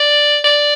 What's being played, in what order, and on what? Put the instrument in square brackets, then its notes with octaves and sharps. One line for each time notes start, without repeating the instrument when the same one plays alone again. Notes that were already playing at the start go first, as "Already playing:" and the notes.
Already playing: [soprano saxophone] D5
D5